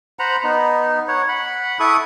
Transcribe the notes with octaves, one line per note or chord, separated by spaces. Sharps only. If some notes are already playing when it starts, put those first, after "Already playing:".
C5 F#5 A#5 B5
B3 D#4
C#5 F#5
F#5 B5
E4 A4 C#6 D#6